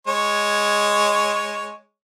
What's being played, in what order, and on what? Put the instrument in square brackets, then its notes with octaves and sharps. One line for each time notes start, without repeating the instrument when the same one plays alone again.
[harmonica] G#3 C#5